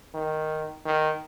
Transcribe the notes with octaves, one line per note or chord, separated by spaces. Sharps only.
D#3
D#3